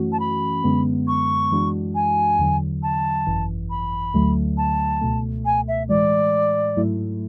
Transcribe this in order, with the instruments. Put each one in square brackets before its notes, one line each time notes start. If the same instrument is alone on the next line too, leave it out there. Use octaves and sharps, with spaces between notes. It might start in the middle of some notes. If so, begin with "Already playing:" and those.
Already playing: [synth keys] F#2 E3 A3 C#4 F#4
[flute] A5
B5
[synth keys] F#2 D3 G#3 B3
[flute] C#6
[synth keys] F#2 E3 G#3 D4 F#4
[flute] G#5
[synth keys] E2 D3 F#3
[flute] A5
[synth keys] G#1 F#2 E3
[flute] B5
[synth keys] D2 D3 F#3 A3
[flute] A5
[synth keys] C#2 B2 A3
[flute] G#5
E5
[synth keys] A2 E3 G#3 [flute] D5
[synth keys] G#2 F#3 A3 E4